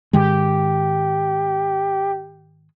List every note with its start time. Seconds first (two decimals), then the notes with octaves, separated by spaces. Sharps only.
0.13 G#2 D#3 G#3 G4